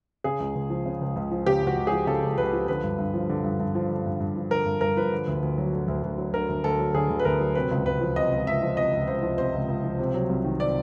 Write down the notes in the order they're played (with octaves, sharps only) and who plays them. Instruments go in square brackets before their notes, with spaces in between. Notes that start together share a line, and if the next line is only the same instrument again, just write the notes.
[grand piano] C#3 G#4
C#2
C#2
F3
C#3
C#2
C#2
F3
C#3 G4
C#2 F#4
C#2
G#4
F3
C#3 A4
C#2
C#2 B4
F3
D3 B4
G2
G2
F3
D3
G2
G2
F3
D3
G2
G2
F3
D3 A#4
G2
G2 A#4
F3 B4
D3
D2
D2
F#3
D3
D2
D2
F#3
D3 A#4
D2
D2 A4
F#3
D3 G#4
D2
B4
D2 A#4
F#3
C3 B4
C#2
C#2 B4
F3
C3 D#5
C#2
C#2 E5
F3
C3 D#5
C#2
C#2 C5
F3
C3 C5
C#2
C#2
F3
C3
F#3
C2
D#3
C3 D5